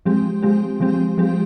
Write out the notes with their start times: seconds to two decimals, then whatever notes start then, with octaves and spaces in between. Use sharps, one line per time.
0.05 F3 G#3 C4 G4
0.43 F3 G#3 C4 G4
0.80 F3 G#3 C4 G4
1.18 F3 G#3 C4 G4